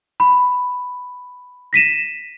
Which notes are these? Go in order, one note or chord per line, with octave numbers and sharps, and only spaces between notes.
B5
A#6 B6 D#7 E7